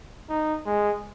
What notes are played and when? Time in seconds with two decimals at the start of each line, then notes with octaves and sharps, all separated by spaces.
0.29 D#4
0.66 G#3